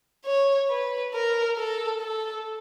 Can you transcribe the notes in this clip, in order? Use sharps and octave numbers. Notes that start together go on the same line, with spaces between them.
C#5
B4
A#4
A4
A4